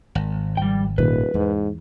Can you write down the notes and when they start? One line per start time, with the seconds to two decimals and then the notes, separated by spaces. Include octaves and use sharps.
0.15 G#1
0.57 F3 G3 G5
0.98 D#1 A#2 D#3 B4
1.34 E2 G#2